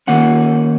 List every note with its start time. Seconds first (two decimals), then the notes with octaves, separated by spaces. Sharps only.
0.07 D#3 A#3 C#4 F#5